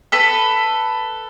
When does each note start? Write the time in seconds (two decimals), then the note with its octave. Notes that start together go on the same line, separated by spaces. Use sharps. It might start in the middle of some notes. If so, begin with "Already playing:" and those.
0.12 A4 B4 B5